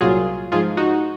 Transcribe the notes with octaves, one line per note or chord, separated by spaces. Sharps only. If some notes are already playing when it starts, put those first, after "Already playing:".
C2 A#2 F#3 F4 G#4
G#2 F3 F4 G#4
D#4 F#4